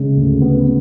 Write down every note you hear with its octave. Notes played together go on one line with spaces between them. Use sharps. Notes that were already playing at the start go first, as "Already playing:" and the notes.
Already playing: C#3 G#3
D2
B3